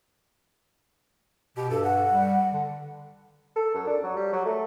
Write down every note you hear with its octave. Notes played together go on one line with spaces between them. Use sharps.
B2 G4
G2 A4
F#5
G3
D3
A4
F#2
D4
F#3
G3
F#3
A3